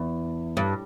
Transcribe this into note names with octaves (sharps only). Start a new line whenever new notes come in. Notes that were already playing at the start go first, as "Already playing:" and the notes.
Already playing: E2
G2